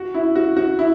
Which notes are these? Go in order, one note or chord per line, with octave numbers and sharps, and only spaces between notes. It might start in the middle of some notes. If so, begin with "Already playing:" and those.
Already playing: F#4
E4
F#4
F#4
E4